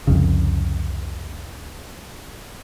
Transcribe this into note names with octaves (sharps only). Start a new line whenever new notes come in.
C2 F2 C#3